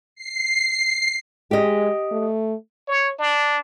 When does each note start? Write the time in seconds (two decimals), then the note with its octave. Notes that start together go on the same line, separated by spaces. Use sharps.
0.15 C7
1.51 G#3 G4 D#5
2.12 A3
2.88 C#5
3.19 D4